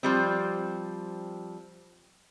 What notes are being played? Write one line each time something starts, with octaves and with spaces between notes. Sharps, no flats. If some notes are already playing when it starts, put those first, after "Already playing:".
F3 G3 C4